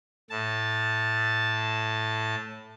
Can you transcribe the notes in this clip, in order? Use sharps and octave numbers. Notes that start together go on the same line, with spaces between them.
A2 A5